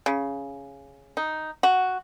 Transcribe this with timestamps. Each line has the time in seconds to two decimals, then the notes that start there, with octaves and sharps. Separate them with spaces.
0.06 C#3
1.17 D#4
1.63 F#4